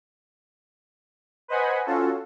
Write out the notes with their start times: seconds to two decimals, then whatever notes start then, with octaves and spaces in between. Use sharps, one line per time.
1.48 B4 C5 D#5 F#5 G#5 B5
1.86 C#4 F4 F#4 A4